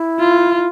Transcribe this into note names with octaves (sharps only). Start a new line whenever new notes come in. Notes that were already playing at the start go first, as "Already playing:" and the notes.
Already playing: E4
F4